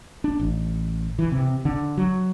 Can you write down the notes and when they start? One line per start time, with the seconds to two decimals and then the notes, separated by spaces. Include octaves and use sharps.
0.24 D4
0.40 A1
1.19 E3
1.32 C3
1.65 D3
1.97 F#3